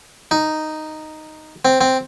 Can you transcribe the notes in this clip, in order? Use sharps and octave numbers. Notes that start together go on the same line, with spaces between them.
D#4
C4
C4